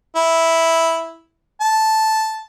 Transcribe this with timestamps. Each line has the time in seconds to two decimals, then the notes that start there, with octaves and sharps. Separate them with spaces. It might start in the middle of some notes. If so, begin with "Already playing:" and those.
0.16 E4
1.61 A5